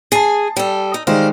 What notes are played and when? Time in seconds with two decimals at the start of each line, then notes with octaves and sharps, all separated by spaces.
0.12 G#4 G#5 A5 C7
0.57 G3 A4
0.94 D#4
1.07 D#3 G3 G#3 D#4 C5 F5